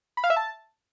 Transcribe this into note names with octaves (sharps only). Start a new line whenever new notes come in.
B5
F5
E5
A5